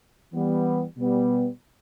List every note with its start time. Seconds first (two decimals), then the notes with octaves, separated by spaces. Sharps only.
0.33 E3 G3 B3
0.97 B2 G3 B3